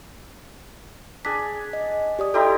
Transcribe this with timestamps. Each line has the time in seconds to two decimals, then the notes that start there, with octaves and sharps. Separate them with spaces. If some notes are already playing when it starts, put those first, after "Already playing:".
1.25 D4 G#4 B6
1.73 D#5
2.19 G4 D5 D#6
2.34 D#4 E4 G4 A4 C6